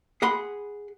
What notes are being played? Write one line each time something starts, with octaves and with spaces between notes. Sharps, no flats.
G#4 F#5 B5 C6